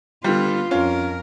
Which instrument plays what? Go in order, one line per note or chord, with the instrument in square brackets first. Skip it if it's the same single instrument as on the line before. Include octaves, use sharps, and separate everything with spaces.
[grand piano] D3 G3 [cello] B3 F4
[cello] F2 A#4 [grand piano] C#4 F4